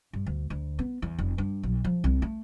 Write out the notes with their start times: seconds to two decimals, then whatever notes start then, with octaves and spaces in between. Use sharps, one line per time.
0.13 G2
0.26 D2
0.50 D2
0.79 B3
1.02 E2
1.19 F1
1.38 G2
1.63 B1
1.84 F3
2.04 C2
2.22 A3